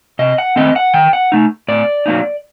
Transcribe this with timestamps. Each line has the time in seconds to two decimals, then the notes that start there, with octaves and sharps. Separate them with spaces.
0.19 C3 D#5
0.38 F#5
0.56 D#3 A3 C4 D#5
0.76 F#5
0.94 D#3 G5
1.13 F#5
1.32 A3 D#4
1.68 A2 D5
2.06 F#3 A#3 D#4